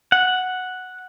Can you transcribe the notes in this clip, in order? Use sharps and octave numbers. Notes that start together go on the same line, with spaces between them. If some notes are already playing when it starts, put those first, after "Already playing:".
F#5